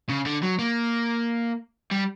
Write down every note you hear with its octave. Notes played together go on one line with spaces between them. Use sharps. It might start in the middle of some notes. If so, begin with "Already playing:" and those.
C#3
D3
F#3
A#3
G3